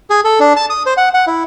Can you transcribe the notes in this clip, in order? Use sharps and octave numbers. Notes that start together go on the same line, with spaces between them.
G#4
A4
D4
A5
D#6
C5
F#5
F#5
E4